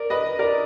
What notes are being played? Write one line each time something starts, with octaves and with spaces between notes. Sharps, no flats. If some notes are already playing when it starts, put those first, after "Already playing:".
Already playing: A#4 D5
B4 D#5
A#4 D5